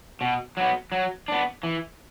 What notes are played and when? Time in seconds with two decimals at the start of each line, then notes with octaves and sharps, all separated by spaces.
0.21 B2
0.57 F#3 B3
0.92 F#3
1.28 B3 D4
1.63 E3